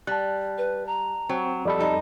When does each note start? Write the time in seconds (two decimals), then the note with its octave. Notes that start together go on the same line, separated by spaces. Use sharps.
0.07 G3 A5 F#6
0.58 B4
0.87 A#5
1.29 F#3 C4
1.65 F2 G3 A4 D5 D#5 B5
1.80 D#4 A5